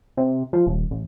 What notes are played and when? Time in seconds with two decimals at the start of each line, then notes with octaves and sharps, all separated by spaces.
0.17 C3
0.53 F3
0.67 D#1
0.91 A1